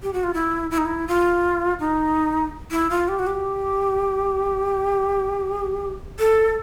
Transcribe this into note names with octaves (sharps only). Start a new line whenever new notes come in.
G4
F#4
F4
E4
E4
D#4
E4
F4
D#4
E4
F4
G4
F#4
G4
A4